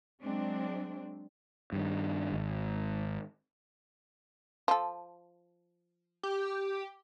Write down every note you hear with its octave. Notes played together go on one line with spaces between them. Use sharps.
F#3 G#3 C4 D4
G2 D#3
G#1
F3 A4
G4